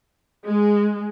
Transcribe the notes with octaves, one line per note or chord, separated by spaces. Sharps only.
G#3